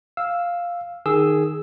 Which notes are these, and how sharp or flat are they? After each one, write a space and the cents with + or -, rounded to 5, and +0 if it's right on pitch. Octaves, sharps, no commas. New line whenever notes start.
F5 +0 E6 +0
D#3 -10 G#4 +0 E6 +0